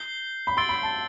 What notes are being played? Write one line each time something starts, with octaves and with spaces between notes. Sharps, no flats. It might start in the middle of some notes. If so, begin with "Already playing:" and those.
Already playing: G6 C7 G7
B5
C6 E6 A6 D7 G7
B5
A5